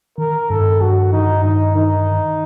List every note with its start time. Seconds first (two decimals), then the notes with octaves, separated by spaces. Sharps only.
0.18 D#3 A#4
0.50 G2 A4
0.81 G2 F#4
1.12 D#3 D#4
1.44 G2 D#4
1.75 D#3 D#4
2.07 D#3